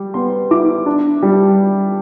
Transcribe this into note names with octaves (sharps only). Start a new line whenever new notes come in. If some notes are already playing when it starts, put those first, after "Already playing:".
Already playing: G3
B3 C6
E4 D6
D4
G3